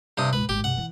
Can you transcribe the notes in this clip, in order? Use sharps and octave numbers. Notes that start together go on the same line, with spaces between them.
G2 C3 D#6
C#2 A2 B4
D1 G#1 G4
F#2 C3 F#5
E3 E4